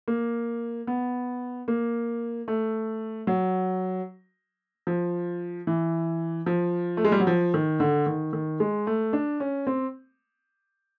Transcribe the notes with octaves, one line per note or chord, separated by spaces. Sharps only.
A#3
B3
A#3
A3
F#3
F3
E3
F3
A3
G#3
G3
F#3
F3
D#3
D3
D#3
D#3
G#3
A3
D4
C#4
C4